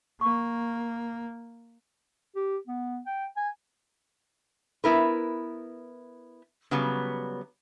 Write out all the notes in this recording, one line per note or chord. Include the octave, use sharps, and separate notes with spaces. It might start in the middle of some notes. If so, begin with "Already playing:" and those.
A#3 C#6
G4
B3
G5
G#5
B3 E4 A#4 B4
C#3 F#3 G3 B3